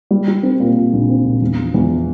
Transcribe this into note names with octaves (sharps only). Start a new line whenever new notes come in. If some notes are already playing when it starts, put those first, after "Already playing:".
G3
G3
C4
A#2
A#2
A#1
C4
A#1
E2
F3
E2